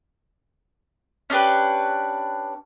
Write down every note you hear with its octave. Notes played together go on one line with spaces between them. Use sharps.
C#4 D4 G4 B4